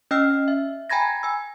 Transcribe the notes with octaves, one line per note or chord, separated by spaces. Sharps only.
C#4 D#5 G5 E6 F6 C7
E5
G5 G#5 A#5 B5 G#6 A#6
G#5 E6